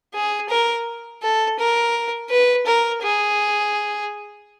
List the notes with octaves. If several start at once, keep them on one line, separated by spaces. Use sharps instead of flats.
G#4
A#4
A4
A#4
B4
A#4
G#4